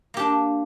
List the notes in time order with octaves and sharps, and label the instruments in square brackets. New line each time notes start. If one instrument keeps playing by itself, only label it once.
[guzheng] A#3
G4
D4